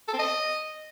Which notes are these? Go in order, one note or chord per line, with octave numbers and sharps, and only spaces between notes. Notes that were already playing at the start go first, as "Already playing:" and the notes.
A4
C4
D#5